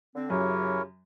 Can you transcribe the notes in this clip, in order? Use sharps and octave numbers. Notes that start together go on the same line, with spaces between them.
D3 C4
F#2 C#3 E4 G4 A#4 C#5